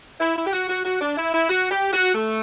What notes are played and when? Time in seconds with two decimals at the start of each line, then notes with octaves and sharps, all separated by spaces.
0.20 E4
0.36 E4
0.47 G4
0.53 F#4
0.69 F#4
0.85 F#4
1.01 D4
1.17 E4
1.33 E4
1.50 F#4
1.71 G4
1.93 F#4
2.15 A3